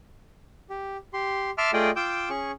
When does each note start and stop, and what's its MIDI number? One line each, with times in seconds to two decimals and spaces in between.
0.70 0.97 67
1.13 1.50 67
1.13 1.50 84
1.58 1.71 76
1.58 1.71 81
1.58 1.71 84
1.58 1.71 86
1.58 1.71 88
1.58 1.71 89
1.73 1.91 57
1.73 1.91 65
1.73 1.91 68
1.73 1.91 74
1.73 1.91 75
1.73 1.91 79
1.96 2.29 65
1.96 2.29 79
1.96 2.29 86
1.96 2.29 88
1.96 2.29 91
2.30 2.52 61
2.30 2.52 68
2.30 2.52 85